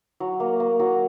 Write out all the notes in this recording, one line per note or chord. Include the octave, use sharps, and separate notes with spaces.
F#3
A#3
A#3
F#3